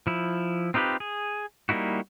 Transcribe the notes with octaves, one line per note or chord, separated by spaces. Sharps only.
F3 E4
C4 D#4 F4 G4 B4
G#4
G3 A#3 D#4 E4 F#4